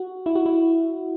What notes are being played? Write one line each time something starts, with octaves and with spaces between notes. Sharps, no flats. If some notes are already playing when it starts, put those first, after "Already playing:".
Already playing: F#4
E4
F#4
E4